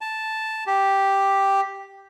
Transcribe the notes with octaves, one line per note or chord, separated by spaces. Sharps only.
A5
G4